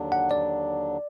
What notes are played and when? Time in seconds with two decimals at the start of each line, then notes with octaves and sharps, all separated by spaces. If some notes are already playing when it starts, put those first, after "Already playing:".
Already playing: D#2 D3 F#3 D4
0.12 F#5
0.31 D5